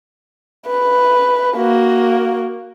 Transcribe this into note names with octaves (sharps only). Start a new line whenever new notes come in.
B4
A#3 F#4